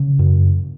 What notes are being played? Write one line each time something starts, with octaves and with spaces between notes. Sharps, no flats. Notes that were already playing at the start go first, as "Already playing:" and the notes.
Already playing: C#3
F#2